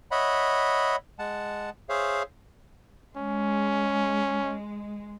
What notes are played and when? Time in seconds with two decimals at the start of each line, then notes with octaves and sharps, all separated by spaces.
0.11 C#5 D#5 E5 F#5 B5
1.19 G#3 F#5 A5
1.89 G#4 C5 C#5 E5 F5
3.17 G#3 C#4